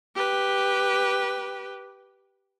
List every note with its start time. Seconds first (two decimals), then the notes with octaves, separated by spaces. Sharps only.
0.15 G4 B4